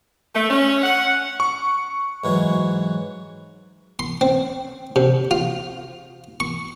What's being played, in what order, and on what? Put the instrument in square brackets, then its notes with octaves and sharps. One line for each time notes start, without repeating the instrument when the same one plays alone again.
[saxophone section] A3
C#4
F#5
[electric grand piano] C#6
[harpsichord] G#2 E3 F#3
C6
C4
C3
F4
C#6